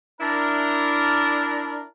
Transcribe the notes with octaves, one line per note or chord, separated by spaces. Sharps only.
D4 E4 A#4